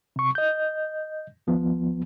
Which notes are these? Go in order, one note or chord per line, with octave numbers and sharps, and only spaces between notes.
C3 C#6
D#5 G6
D#2 F3 B3